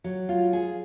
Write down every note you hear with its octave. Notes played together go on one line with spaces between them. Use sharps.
F#3
F4
G#4